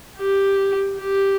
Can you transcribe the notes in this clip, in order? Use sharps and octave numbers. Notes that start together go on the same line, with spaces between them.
G4
G4